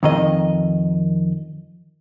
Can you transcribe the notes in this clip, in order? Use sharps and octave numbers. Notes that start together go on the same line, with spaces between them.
F2 D#3 D#5